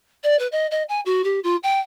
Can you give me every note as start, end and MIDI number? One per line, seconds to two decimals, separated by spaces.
0.24 0.38 74
0.39 0.47 71
0.52 0.67 75
0.71 0.83 75
0.89 1.01 80
1.06 1.22 66
1.24 1.40 67
1.44 1.56 65
1.63 1.79 79